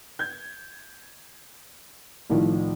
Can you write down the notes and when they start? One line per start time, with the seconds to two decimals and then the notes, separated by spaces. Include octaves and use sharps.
0.19 G6 G#6
2.30 C2 A2 D#3 F3